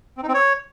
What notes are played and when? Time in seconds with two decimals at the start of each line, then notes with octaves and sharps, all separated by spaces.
0.17 C4
0.23 D#4
0.28 C4
0.34 C#5